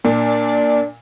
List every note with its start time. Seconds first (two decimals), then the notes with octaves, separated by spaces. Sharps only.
0.05 A#2 D4
0.27 D5